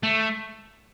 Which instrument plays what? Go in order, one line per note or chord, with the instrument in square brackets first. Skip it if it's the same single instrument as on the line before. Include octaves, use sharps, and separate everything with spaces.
[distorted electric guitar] A3